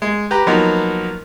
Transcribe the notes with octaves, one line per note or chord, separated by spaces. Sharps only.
G#3
G4 B4 A#5
F3 F#3 A#3 B3 D#4